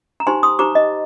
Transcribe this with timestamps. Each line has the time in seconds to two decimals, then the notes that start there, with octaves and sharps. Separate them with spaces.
0.20 A#5
0.27 D#4 G4 C5 G#5 C6
0.43 C6 D#6
0.59 D#4 G4 C5 A#5 D6
0.75 D#5